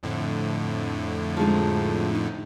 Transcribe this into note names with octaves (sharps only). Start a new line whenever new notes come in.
F2 A2 D3
F3 G#3 D#4
D#4